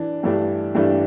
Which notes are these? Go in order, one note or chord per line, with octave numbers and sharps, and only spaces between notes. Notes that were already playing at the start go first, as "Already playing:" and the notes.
Already playing: E3 D4
G2 E3 A3 D4 G4
G2 E3 A3 D4 G4